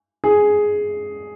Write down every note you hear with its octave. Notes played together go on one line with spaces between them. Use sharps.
G#4